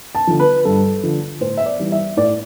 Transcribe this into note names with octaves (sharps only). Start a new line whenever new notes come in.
A5
D3 F3
B4
G2 A4
D3 F3
A2 C5
E5
D5
E3 G3
E5
A2 D5